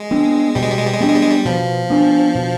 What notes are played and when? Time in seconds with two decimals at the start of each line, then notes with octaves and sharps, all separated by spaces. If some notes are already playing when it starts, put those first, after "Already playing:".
Already playing: G#3
0.11 B3 D4
0.55 B2 G3
0.63 G#3
0.71 G3
0.79 G#3
0.86 G3
0.94 G#3
1.00 G3 B3 D4
1.09 G#3
1.16 G3
1.23 G#3
1.31 G3
1.45 B2 F3
1.90 B3 D4
2.35 B2